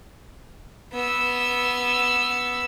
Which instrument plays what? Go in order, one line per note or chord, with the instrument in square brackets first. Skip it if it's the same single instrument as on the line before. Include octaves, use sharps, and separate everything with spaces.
[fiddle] B3 E6